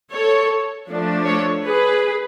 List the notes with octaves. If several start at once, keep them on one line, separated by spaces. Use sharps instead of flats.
A4 C#5
F3 A3 D4
A4 C#5
G#4 B4